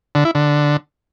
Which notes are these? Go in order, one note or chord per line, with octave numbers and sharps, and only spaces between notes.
D3
E4
D3